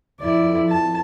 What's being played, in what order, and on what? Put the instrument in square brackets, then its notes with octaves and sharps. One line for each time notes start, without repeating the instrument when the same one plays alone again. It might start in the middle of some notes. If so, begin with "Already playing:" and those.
[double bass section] F2 [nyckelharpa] E4 D5
[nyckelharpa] A5